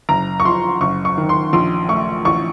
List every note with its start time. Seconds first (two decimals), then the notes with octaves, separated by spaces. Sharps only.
0.09 F#1 A#5
0.40 C#6
0.45 F3 C6
0.81 F#1 C#6
1.05 C#6
1.17 D#3
1.29 C6
1.53 A#1 C6
1.89 A3 C#6
2.25 A1 C#6